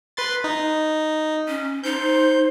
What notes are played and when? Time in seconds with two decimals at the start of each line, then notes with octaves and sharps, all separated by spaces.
0.17 B4 C6 A6
0.44 D#4
1.48 C#4
1.84 D#4 C5 G6